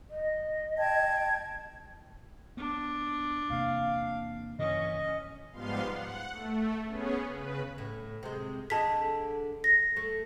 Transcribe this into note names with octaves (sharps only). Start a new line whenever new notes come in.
D#5
G5 A5 G#6
B3 D4
E2 C3 A#3 F5
G2 C#3 E3 C#4 D#5
G#2 F3 G3 B3 F5 C6
F#5
A3
B3 C#4 G#4
C#3 B4
A2
C3 G#3
D3 G#4 D#5 A5 B6
A#6
A3